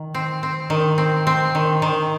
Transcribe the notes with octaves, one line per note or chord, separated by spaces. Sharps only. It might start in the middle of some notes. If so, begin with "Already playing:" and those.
Already playing: D#3
C4
C4
D#3
C4
C4
D#3
D#3